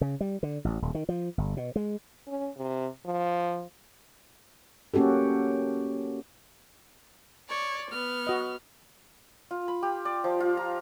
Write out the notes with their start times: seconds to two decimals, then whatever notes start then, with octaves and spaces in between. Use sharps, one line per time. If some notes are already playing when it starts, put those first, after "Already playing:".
0.01 C#3
0.21 G3
0.43 D3
0.65 A1
0.82 D#1
0.95 D#3
1.09 F3
1.38 G1
1.57 B2
1.76 G#3
2.28 C#4
2.57 C3
3.06 F3
4.94 A#3 C#4 F#4 G4 A4
7.49 C#5 D5
7.91 B3 F6
8.27 F#4 D#5
9.51 F4
9.68 B5
9.82 G4
10.05 D5
10.24 F3
10.40 F4
10.57 A#5